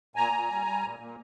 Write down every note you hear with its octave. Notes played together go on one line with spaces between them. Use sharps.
A#2 G#5 A#5
A#2
G3
G3
A#2
A#2